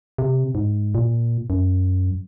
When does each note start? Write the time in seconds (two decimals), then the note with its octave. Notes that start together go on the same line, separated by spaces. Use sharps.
0.18 C3
0.55 G#2
0.95 A#2
1.50 F#2